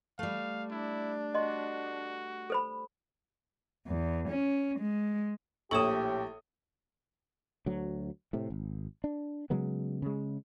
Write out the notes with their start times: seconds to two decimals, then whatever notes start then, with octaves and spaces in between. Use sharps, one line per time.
0.19 G3 A3 F5
0.71 D4 E4
1.35 F#4 D#5 C6
2.50 A4 C5 B5
3.87 E2
4.29 C#4
4.79 G#3
5.71 A#1 A2 G4 A4 C#5 C#6 D#6 E7
7.66 D2 F#3
8.33 A2 C3
8.50 G#1
9.04 D4
9.50 C#3 F#3 G#3 B3
10.02 C#3 G#3